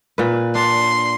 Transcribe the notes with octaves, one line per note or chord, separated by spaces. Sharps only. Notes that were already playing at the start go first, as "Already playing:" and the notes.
A#2 B4
D4 C6